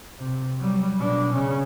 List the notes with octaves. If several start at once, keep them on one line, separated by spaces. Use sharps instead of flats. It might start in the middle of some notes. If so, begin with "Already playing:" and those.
C3
F#3 G3
B2 D4
C#3 C#4